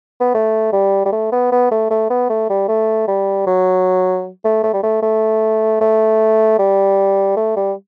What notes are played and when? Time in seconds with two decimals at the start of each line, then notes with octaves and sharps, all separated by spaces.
0.21 B3
0.35 A3
0.73 G3
1.05 G3
1.12 A3
1.32 B3
1.52 B3
1.71 A3
1.90 A3
2.10 B3
2.30 A3
2.50 G3
2.68 A3
3.08 G3
3.47 F#3
4.45 A3
4.63 A3
4.74 G3
4.83 A3
5.02 A3
5.81 A3
6.59 G3
7.37 A3
7.56 G3